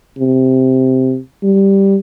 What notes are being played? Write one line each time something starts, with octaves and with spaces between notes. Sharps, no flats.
C3
G3